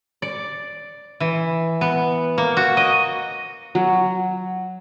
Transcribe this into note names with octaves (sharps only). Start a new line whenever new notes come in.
D5
E3
B3
A#3
F#4
D#5
F#3